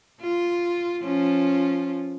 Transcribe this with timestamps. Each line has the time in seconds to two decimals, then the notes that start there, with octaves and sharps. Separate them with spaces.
0.21 F4
1.03 F3 C#4 F4